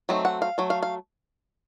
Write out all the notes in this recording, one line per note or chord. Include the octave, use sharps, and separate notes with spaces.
F#3 A3 C4 D#4
F#5
F5
F#3 A3
F5
F5